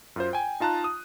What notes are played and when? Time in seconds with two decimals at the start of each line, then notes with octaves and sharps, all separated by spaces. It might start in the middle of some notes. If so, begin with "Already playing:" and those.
0.16 F#2 F4 C5
0.33 G5 G#5
0.60 D#4 F4 A5 A#5 F#6
0.84 D#6